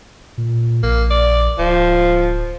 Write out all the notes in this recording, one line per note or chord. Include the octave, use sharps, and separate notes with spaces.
A#2
A#1 A#3
D5
D1 F3